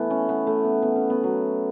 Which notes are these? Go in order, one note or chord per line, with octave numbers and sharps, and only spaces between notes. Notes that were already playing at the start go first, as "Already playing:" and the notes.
Already playing: E3 A3 B3
C#4
B3
A3
B3
B3
C#4
B3
F#3